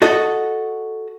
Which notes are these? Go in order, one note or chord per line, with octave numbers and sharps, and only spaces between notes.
F#4 A4 D#5